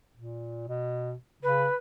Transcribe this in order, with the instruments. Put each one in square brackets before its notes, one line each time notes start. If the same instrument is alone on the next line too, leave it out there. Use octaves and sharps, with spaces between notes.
[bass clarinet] A#2
B2
[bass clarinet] C#3 [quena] B4